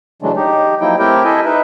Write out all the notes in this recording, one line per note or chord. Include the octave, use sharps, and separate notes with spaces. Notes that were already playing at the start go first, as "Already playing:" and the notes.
C#3 E3 F#3 G#3 A3 D4
D#4 G4
F3 F#3 A#3 D#4 E4 G5
A3 C4 E4 G4 A#4 G5
E4 A4 D#5 E5 G#5
D#4 B4 E5